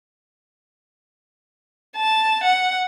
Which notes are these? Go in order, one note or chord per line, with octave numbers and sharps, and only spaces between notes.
A5
F#5